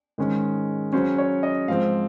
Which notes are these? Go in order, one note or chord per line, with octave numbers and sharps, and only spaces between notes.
G#2 D#3 G#3 C#4
C#3 F#3 C#4 C5
C#5
D#5
G#2 F3 C4 F5